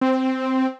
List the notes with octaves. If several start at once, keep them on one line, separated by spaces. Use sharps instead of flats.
C4